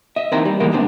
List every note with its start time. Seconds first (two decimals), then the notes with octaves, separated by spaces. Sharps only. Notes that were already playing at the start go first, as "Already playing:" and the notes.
0.16 D#5 E5
0.32 D#2 D#3 E3 A#3 C4 A#5
0.45 G3
0.60 D2 E3 G3 G#3 A#3 A#4
0.72 D2 G2 B3 C4 D4